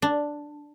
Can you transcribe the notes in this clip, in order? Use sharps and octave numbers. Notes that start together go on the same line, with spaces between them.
D4